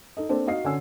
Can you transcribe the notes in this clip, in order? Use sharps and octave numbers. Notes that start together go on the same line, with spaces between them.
D#4 A4 D#5
A#3 C4 D4 A4 C5
D#4 F#4 D#5 F5 C7
D3 C#4 G#5 E6